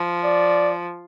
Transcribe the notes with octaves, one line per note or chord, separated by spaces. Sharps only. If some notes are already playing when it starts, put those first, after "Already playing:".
Already playing: F3
D5